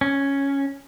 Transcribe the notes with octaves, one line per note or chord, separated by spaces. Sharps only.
C#4